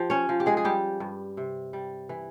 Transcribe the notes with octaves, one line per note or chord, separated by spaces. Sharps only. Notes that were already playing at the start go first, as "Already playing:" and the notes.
Already playing: F3 F4 G4
C#4 C#5
F3
G4
G#3 G#4
G#4
G3 G4
G2
C3
G3
E3